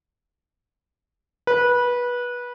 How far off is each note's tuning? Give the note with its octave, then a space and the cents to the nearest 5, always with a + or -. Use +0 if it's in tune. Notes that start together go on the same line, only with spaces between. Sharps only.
B4 -20